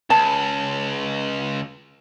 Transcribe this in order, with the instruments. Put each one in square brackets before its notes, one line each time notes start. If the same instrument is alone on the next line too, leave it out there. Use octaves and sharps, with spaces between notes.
[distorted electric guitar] C#2 [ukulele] A5